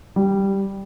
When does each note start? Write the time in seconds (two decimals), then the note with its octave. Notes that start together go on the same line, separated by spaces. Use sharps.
0.16 G3